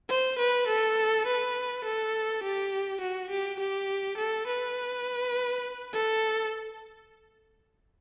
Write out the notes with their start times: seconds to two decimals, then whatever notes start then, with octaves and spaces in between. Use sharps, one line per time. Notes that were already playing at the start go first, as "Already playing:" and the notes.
0.09 C5
0.39 B4
0.67 A4
1.26 B4
1.84 A4
2.43 G4
3.01 F#4
3.30 G4
3.60 G4
4.18 A4
4.47 B4
5.93 A4